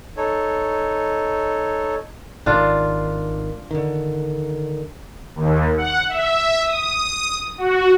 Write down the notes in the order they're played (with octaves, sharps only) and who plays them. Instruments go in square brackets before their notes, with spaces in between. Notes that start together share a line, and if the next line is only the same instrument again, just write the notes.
[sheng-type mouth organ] D#4 A4 C#5
[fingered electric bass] G#1 D#3 [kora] D4 F4
[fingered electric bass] D3 D#3
[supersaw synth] D#2
F#5
E5
D#6
F#4